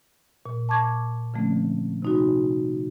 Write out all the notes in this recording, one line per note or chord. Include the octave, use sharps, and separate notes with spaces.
A#2
A5 C#6 D6 G#6
D3 F3 A3 A#3 C4 C#4
C3 D#4 F#4